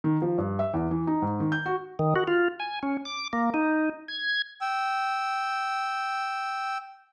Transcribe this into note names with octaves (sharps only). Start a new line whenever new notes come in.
D#3
F3
G2
E5
E2
E3
D#4
G#2
D#3
G6
F#4
D#3
F#4
F4
G#5
C#4
D6
A#3
D#4
G#6
G5 E6